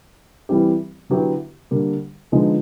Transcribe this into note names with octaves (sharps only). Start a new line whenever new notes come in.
E3 G3 C4 E4 G4
D3 F#3 B3 E4 G4
D3 G3 A#3
D3 F3 G#3 B3 D#4